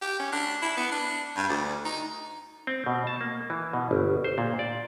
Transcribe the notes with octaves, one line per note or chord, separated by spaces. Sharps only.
G4
C#4
D4
E4
B3
D4
G2
D2
D#4
C4
B2
A5
A#3
E3
B2
G1
C5
A#2
D5